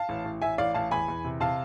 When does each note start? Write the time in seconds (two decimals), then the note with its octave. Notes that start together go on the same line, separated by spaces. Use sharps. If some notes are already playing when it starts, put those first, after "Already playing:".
Already playing: F5 A5
0.09 A1
0.25 A1
0.42 A1 E5 G#5
0.58 A1 D5 F5
0.74 A1 F5 A5
0.91 E2 G#5 B5
1.08 E2
1.24 C3
1.40 C3 F5 A5